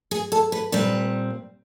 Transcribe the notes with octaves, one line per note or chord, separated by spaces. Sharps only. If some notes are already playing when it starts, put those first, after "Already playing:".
G#4
A4
B4
A#2 G3 C4 B4